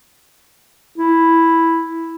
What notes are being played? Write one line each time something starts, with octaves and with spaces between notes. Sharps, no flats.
E4